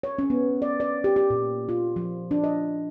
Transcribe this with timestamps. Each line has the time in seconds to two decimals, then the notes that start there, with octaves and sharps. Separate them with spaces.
0.03 C#5
0.18 C#4
0.30 B3
0.62 D5
0.80 D5
1.04 G4
1.16 G4
1.30 A#2
1.69 F4
1.96 F3
2.31 D4
2.44 D#5